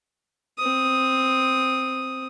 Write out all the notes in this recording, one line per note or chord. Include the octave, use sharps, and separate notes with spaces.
C4 D#6